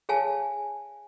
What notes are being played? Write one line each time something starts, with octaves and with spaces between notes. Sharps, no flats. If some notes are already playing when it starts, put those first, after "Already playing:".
G#4 C#5 F5 G#5 A5